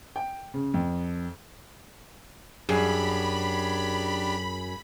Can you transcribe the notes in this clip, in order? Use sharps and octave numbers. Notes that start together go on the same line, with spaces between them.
G5
C#3
F2
F#2 D4 G4 G#4 B5